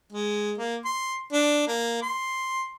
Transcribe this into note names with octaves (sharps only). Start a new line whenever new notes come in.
G#3
A#3
C6
D4
A#3
C6